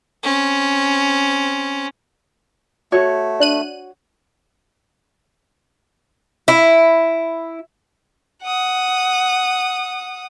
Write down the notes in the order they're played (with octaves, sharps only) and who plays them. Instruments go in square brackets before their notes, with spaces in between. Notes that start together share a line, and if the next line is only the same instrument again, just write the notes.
[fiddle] C4 C#4
[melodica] A3 [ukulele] F#4 C#5
[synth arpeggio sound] D4 F#6 D#7
[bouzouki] E4
[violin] F#5 D#6